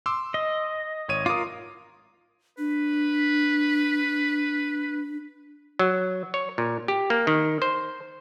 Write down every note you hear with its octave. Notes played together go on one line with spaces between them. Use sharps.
C6 D6 E6
D#5
G#1 C#5 D#7
F4 A#4 D6 D#6
D4 B4
F#3
C#5
A#2
G4
A#3
D#3
C5